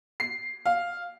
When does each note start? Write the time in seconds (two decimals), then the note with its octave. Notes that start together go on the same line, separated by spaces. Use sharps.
0.20 C7
0.66 F5